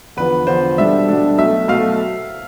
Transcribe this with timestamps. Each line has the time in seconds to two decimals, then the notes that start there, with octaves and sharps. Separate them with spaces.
0.17 E2 D3 F3 B3 F4 B4
0.47 E2 D3 F3 B3 F4 C5
0.78 B2 G3 D4 A4 E5
1.08 B2 G3 D4 A4
1.38 B1 B2 A3 E5
1.68 B1 B2 A3 F5